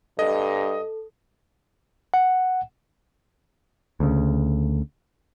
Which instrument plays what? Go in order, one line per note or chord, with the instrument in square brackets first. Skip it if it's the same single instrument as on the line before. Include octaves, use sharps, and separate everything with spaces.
[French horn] G2 [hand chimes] A4 [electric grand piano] D#5
[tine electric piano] F#5
[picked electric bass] D2 C#3